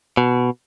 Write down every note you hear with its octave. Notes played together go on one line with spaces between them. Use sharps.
B2